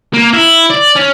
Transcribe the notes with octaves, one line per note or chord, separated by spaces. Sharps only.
A#3
E4
D5
C#4